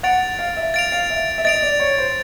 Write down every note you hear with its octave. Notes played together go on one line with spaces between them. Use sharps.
F#5 A6 D7 F7
F5
E5
F5 A6 D7 F7
F5
E5
E5
D#5 A6 D7 F7
D5
C#5
C5